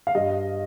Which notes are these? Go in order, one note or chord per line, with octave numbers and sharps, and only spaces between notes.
F5
G2 D#5